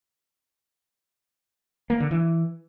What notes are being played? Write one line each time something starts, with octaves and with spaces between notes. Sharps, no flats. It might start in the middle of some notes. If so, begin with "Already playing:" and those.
A#3
D3
E3